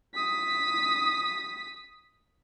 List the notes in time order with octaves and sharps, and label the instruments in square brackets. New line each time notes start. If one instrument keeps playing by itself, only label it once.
[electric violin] D#6 B6